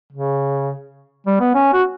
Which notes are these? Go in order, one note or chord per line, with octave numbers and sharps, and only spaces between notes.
C#3
G3
B3
C#4
F#4